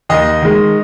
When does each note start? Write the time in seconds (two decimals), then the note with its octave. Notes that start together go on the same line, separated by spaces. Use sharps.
0.09 D#2 D#5
0.42 D#3 G#3